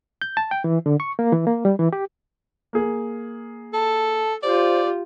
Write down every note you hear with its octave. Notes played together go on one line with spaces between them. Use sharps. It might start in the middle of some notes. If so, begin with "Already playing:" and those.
G6
A5
G5
E3
D3
C#6
A#3
E3
A#3
G3
E3
G4
A#3 G#4
A4 A5
F4 G4 C5 D5